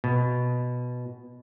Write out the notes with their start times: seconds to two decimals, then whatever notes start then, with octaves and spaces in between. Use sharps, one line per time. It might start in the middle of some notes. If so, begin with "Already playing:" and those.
0.04 B2